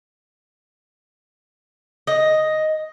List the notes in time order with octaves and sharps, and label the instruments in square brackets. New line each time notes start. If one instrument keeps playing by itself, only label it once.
[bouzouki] D#5